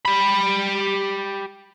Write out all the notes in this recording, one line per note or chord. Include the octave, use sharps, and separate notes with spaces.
G4 B5